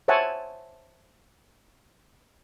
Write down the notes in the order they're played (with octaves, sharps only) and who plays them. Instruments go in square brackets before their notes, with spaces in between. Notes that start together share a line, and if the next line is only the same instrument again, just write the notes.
[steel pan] C5 C#5 E5 F#5 G#5 A5